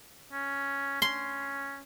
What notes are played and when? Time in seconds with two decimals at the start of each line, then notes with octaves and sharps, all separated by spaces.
0.32 C#4
1.02 C#4 C6